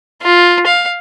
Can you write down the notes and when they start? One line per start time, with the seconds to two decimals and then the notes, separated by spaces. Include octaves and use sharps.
0.23 F4
0.66 F5